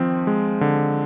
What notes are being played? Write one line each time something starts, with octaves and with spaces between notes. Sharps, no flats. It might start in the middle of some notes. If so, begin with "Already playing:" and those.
Already playing: D#3 F3 C4
G#3
D3